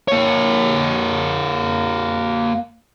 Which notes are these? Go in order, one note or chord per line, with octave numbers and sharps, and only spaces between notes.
A#3 C#5